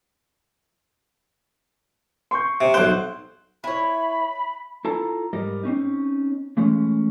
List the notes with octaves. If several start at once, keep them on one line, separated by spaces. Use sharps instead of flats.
C6 C#6 G6
C3
B1 C5 C6 F#6
E4 C#5 B5
E4 F4 A4 A5 A#5
G#2 G3 A#4 D#5
C4 C#4 D#4
E3 G#3 A3 C#4